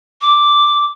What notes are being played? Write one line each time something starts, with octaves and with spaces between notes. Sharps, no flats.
D6